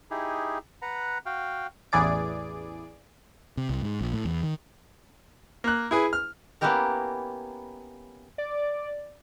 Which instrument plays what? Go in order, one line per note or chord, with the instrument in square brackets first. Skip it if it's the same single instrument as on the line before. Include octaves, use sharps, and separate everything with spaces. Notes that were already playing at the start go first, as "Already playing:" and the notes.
[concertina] D#4 E4 G4 G#4
B4 F#5 A#5
F#4 F5 G5
[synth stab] A1 E2 E3 G#4 D5 D7
[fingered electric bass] C3
C2
G#2
A#1
A2
E2
D#3
[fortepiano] A#3 F#6
E4 G#4 B4
F6
[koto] A#3 B3 C#4 E4 G4 A#4
[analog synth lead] D5